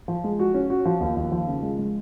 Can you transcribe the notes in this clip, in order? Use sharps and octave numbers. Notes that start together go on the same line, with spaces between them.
F3
G#3
F#4
C#4
F#4
F3
D#2
D#2
F3
C#3
G#3
G#3